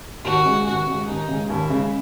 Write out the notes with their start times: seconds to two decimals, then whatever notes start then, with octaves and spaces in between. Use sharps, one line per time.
0.24 D#2 F#4
0.44 C#3 G#3
0.66 D#2 F#4
0.86 C#3
0.91 G#3
1.07 D#2 D#4
1.28 C#3 G#3
1.49 D#2 E4
1.70 C#3 G#3